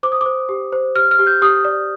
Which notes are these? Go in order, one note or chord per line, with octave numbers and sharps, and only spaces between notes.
C5 D6
D#6
C5 D6
G4
C5
G4 F6
F6
G4
G6
G4 D#6
D5